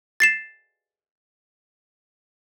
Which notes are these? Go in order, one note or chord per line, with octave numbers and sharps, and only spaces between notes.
A6 C7 E7